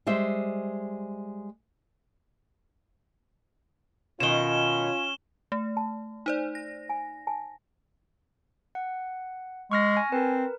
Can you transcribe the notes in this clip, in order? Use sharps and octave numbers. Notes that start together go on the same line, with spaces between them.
G3 G#3 C5 E5
B2 D#3 C#4 F4 E7 G7
A3
A5
D#4 C5 D5
A#6
G#5
G#5 A5
F#5
G#3 C#6 F6 A#6
G#5
C4 A#4 B4